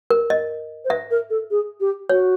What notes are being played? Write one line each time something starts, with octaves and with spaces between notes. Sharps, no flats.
A#4
D#5
C5
B4 E5
A#4
A4
G#4
G4
F#4 C#5